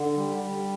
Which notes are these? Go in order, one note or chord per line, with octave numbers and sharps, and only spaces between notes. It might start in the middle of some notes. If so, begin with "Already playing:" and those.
Already playing: D3
G3
G3